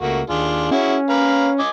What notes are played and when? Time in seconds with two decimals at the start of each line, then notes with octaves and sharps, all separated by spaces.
0.01 C#2 A3 A#3 F#4
0.30 D#2 D4 F4 G#4
0.71 C#4 E4 F#4 G#4
1.09 B4 F5 A#5
1.59 D#5 G#5 D6